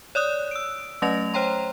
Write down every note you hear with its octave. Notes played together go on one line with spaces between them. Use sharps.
C#5 D5 D#6 F#6
E6 D7
F#3 A3 C#4 D#5 A#6 F7
C5 C#5 G5 A#5 C6